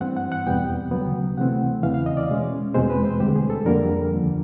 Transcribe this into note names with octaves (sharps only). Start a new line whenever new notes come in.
G2 E3 G3 C4 F#5
F#5
F#5
E2 B2 G3 B3 G5
D2 C#3 F#3 B3
C3 E3 A3 C4 F#5
E2 C#3 E3 F5
F5
D#5
D5
B2 G#3 C#4
E2 B2 G#3 C4 C5
B4
C5
D2 D3 G3 G4
G#4
A4
F2 D3 G3 A#3 A#4
D#2 D3 F3